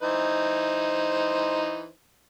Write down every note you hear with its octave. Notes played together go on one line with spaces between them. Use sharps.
E3 D#4 C5